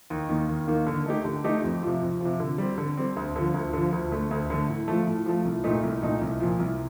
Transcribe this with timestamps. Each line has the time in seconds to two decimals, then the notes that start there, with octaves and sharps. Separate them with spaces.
0.10 D#2
0.29 D#3 A#3
0.49 D#2
0.68 D#3 A#3
0.87 D3
1.06 A3 D#4 G4
1.25 D3
1.44 A3 D#4 G4
1.63 F2
1.83 C3 F3
2.02 F2
2.21 C3 F3
2.40 D3
2.58 G3 C4
2.78 D3
2.97 G3 C4
3.16 D2
3.36 D3 F3
3.54 D2
3.73 D3 F3
3.92 D2
4.11 D3 A3
4.31 D2
4.50 D3 A3
4.69 A2
4.88 F3 A3
5.07 A2
5.26 F3 A3
5.45 C2
5.64 A#2 A3 D#4
5.83 C2
6.02 A#2 A3 D#4
6.21 C2
6.40 A#2 F3
6.60 C2